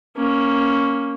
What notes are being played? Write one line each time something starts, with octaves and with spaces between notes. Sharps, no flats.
A#3 C#4